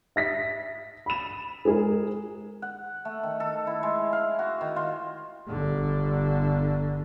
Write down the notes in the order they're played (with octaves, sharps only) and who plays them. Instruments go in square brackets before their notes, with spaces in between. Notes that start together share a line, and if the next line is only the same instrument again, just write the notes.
[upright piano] E5 A#6 B6
B5 E7
G#3 G#4 A#4
[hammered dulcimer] F#5
A3
D#3
A4
E4
G#3
F5
F#4
D#3
F4
[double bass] G1 D3